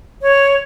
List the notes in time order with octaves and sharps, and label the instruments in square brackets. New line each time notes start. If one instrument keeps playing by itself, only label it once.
[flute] C#5